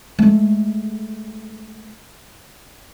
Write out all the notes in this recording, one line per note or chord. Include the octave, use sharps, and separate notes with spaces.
G#3 A3